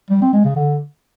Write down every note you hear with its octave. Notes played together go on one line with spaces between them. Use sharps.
G3
C4
G#3
C#3
D3